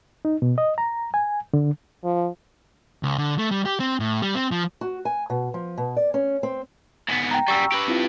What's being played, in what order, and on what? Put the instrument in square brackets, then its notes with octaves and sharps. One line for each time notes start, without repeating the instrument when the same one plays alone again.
[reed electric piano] D#4
B2
D#5
A#5
G#5
D3
[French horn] F3
[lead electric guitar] C#2
D3
A3
G3
G4
C4
A2
G3
C4
F3
[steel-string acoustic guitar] F#4
G#5
B2
F3
B2
D5
C#4
C4
[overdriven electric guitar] G#2 B3
[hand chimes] G5 A#5
[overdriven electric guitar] F#2 G3 [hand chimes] C#6 E6
[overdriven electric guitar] G4 B4
[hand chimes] C4 E4 F4